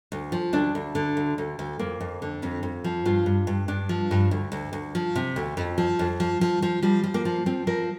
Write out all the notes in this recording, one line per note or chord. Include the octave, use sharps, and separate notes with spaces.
D2
F3
D2 D4
D2
D3
D2
D2
D2
F2 A#3
F2
D3
F2 C4
F2
F3
G2 F4
G2
G2
G2 D4
F3
G2
D2
D2
D2
F3
C3
D2
F2
F3
F2
F3
F3
F3
F3 G3
F3
A#3
F3
F3 C4
F3 A#4